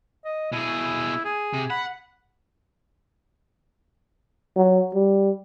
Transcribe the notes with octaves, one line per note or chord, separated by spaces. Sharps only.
D#5
B2 E4 G#4
G#4
C3
F#5 B5
F#3
G3